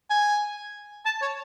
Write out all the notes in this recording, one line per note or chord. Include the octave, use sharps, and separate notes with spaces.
G#5
A5
C#5